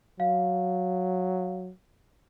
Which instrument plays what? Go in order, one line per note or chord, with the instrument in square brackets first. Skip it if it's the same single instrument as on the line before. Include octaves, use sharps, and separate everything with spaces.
[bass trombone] F#3 [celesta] F5